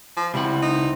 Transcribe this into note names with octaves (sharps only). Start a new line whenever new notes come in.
F3
C#2 E3 G3 C4 E4 F#5
D#4